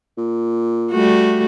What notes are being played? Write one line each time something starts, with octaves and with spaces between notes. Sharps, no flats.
A#2
G3 A3 F#4